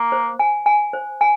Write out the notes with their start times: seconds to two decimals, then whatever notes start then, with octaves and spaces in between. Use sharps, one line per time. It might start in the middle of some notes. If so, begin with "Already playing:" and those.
Already playing: A#3
0.12 C5
0.39 G#5
0.66 G#5
0.93 C5
1.21 G#5